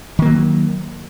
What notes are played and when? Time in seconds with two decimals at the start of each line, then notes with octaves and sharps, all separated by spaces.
0.19 D#3
0.22 A#3
0.25 F#3